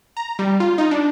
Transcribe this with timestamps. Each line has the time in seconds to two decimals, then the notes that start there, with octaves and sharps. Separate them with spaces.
0.17 A#5
0.39 G3
0.60 F4
0.78 D#4
0.91 D4